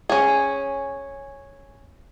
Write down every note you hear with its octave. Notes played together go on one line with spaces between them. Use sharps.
C#4 G#4